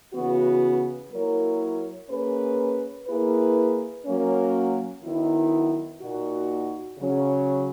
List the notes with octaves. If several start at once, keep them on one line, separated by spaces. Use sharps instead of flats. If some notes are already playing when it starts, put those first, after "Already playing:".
C#3 E3 B3 F#4
F#3 A#3 E4 A#4 C#5
A#3 C#4 G#4 B4
A#3 E4 G#4 B4
F#3 A#3 C#4
D#3 F#3 B3 E4
A#2 A#3 D#4 F#4
C#3 F#3 C#4